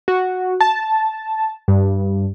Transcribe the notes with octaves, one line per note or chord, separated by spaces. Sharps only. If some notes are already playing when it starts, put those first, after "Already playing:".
F#4
A5
G2